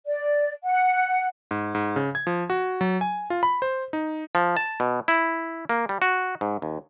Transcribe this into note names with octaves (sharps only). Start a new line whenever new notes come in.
D5
F#5
G#2
G#2
C#3
G#6
F3
F#4
F#3
G#5
F4
B5
C5
D#4
F3
A5
B2
E4
A#3
G3
F#4
G#2
D#2